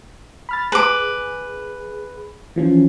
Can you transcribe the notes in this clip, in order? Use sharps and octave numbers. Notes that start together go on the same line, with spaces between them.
B5 F6 A6
G#4 B4 D6
E3 F3 C#4